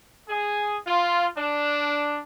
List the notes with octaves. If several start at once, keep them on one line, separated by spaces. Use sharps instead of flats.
G#4
F4
D4